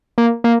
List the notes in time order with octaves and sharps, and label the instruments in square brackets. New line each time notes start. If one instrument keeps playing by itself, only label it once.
[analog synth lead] A#3
A#3